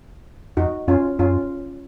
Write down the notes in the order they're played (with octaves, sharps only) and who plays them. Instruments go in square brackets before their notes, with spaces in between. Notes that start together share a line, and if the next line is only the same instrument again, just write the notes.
[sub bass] F2 [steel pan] D#4 F#4
[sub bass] F#2 [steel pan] C#4 F4
[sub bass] F#2 [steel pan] C#4 F4